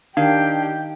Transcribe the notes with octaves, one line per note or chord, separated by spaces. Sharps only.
D#3 D4 G4 F5